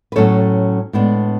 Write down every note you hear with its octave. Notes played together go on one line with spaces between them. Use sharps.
B4
A2 F#3 C#4 A4 C#5
A2 G#3 B3 D4